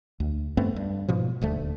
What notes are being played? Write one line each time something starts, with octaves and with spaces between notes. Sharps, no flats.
D2
G2 A3 B3 C4
G2
G#2 B2 F3
D#1 D2 A3